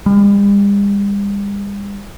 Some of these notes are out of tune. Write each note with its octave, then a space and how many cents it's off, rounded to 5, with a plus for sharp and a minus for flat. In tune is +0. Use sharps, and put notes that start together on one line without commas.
G3 +45